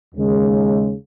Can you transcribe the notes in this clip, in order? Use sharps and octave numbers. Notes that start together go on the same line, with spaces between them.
D#2 C#3 G#3